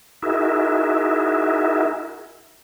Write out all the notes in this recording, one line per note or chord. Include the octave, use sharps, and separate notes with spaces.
D#4 E4 F#4 G#4 A#4 E5